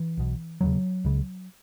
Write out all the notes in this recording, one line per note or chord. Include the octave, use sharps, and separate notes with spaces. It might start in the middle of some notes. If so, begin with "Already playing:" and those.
Already playing: E3
B1 B2
E1 D#2 C#3 F#3
C#2 C#3